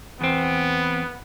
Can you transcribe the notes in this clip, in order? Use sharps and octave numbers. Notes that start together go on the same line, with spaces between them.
E2 B3 C4